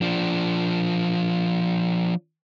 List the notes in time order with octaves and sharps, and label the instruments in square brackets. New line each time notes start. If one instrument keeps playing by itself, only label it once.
[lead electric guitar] F3 D4